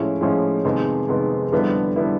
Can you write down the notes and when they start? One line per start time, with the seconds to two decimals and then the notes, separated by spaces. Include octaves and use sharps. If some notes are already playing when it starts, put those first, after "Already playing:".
Already playing: A2 F3 G#3 C#4 E4
0.21 A2 F3 G#3 C#4 E4
0.65 F2 C3 D#3 G#3 B3
1.09 F2 C3 D#3 G#3 B3
1.52 F2 D3 G3 B3 E4
1.96 D3 G3 B3 E4